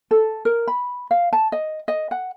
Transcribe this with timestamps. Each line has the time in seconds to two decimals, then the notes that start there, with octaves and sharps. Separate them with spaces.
0.11 A4
0.45 A#4
0.67 B5
1.11 F5
1.33 A5
1.52 D#5
1.88 D#5
2.11 F#5